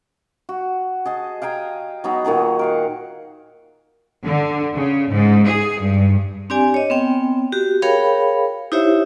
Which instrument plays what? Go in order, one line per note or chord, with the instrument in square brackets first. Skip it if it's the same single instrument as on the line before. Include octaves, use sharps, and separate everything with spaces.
[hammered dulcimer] F#4
G#4 D#5 A5
F5 G5 G#5 A#5
F#3 B3 D#4 G#4
A#2 D#3 F#3 G#4
A#4 F5 F#5
[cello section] D3
C#3
G#2
G#4
G2
[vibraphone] C4 D4 G4 D5 G#5
C#5 D#5
B3 C4 G5
F#4 G4
G#4 A#4 C#5 F5 G5 B5
D#4 E4 G4 C5 C#5 E5